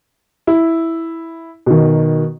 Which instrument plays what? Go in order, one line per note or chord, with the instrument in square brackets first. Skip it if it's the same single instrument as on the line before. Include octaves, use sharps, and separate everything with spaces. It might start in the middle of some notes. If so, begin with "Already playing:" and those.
[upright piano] E4
B2 D#3